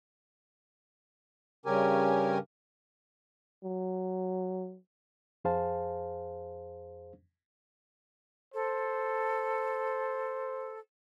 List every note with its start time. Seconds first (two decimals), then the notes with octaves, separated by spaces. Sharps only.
1.66 G2 C#3 C#4 G4 A#4 G#5
3.64 F#3
5.44 F2 G#4 C5 F5 A5
8.54 A4 C5